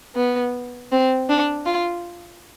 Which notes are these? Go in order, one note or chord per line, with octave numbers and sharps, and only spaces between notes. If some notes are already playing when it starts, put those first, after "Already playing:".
B3
C4
D4
F4